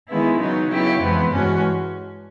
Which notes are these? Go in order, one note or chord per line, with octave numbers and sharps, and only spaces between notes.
D#3 G#3 B3 E4
C#3 F#3 B3 D#4
C#3 F#3 B3 E4 G4
F2 C3 E3 G#3 B3
G2 E3 G#3 C#4 F#4